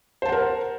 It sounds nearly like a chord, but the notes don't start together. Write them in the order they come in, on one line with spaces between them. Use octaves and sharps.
C5 A5 F#5 A#4